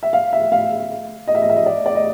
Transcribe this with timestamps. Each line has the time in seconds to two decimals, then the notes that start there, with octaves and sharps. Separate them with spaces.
0.03 E5
0.13 F5
0.33 E5
0.52 F5
1.28 D#5
1.35 E5
1.42 D#5
1.50 E5
1.56 D#5
1.66 D5
1.86 D5
1.95 D#5